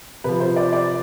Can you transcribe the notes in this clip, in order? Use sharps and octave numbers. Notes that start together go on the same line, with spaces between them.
C3 F3 B4
C5
D5
D5